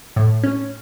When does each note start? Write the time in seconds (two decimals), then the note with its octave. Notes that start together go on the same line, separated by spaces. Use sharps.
0.16 A2
0.44 C#4